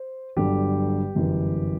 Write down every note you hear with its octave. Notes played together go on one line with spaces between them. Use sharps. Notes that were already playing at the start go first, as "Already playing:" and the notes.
Already playing: C5
G1 G2 D3 F#3 G4
G1 F#2 E3